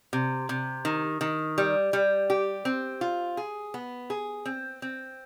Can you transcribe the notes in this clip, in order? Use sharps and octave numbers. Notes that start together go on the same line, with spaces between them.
C3
C3
D#3
D#3
G3
G3
G4
C4
F4
G#4
B3
G#4
C4
C4